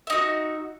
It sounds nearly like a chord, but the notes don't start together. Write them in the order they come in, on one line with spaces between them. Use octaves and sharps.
E5 D#4 F#4